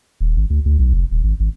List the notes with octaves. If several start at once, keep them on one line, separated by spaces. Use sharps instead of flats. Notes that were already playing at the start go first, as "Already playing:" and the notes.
D#1
G#1
D2
D2
B1
F1
D#1
G#1
G#1